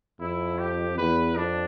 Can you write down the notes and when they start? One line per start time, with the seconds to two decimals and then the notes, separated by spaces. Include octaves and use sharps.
0.21 F2 E4
0.59 G4
0.98 E2 B4
1.37 F2 D4